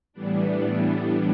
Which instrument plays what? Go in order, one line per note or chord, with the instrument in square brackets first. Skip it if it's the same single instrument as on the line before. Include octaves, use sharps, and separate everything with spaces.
[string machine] A2 E3 G3 B3 D4